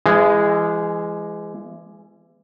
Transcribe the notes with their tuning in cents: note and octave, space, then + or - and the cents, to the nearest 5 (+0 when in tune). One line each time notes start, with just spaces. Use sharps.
E3 +35 G#3 -10